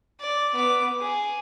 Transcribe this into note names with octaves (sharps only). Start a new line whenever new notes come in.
D5
B3 D6
G#4